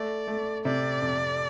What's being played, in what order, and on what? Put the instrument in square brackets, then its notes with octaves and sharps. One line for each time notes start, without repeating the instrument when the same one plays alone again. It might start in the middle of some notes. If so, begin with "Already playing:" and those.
Already playing: [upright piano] A3 [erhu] D5
[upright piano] A3
[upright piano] C3 [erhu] D5
[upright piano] F2